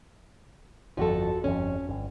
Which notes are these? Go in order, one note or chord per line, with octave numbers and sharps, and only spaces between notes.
G1 F2 F3 F#4 A4
G1 F2 C#4
G1